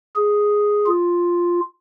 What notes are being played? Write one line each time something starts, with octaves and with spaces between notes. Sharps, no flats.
G#4
F4